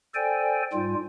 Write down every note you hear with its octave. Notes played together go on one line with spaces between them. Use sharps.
A4 C5 D5 G5 G#5
G#2 G3 F4